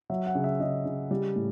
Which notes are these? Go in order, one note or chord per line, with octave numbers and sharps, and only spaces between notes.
F#3 E5
F#5
C#3
E5
C#3 D#5
C#3
G3
A2